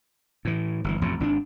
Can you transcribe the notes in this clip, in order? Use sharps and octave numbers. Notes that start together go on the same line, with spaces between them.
A2 E3
G1 D3 E3
A1 F2 A2 C3
G#1 C#4 D4